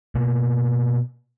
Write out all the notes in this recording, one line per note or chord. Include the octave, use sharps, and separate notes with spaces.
B2 A#3